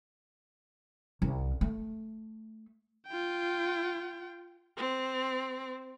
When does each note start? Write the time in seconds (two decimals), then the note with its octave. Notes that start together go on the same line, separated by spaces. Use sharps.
1.22 C2
1.61 A3
3.08 F4 G5
4.77 C4